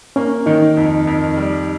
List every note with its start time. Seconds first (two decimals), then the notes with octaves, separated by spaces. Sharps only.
0.16 A#3 C#4
0.46 D#3 D#4
0.77 F2
1.07 F2
1.37 G3